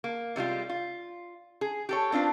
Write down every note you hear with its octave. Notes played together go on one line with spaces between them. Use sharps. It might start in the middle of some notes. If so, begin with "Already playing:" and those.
A#3
C3 G3 G#3 F4
F4
G#4
G4 A4 C#5
C4 D4 F4 B4